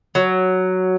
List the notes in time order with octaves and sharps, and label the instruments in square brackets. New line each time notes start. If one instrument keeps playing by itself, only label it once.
[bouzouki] F#3